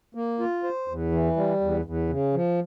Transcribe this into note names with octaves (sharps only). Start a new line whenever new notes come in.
A#3
F4
C5
E2
E3
G3
E2
E2
C#3
F3